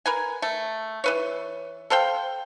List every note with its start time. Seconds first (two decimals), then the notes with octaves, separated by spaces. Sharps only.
0.06 A#4 B4 G#5
0.42 A3
1.04 E3 B4 C#5
1.90 A4 C5 F5 G5